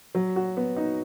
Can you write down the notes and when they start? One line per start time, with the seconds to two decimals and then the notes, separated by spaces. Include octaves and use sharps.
0.15 F#3
0.36 F#4
0.57 B3
0.76 D#4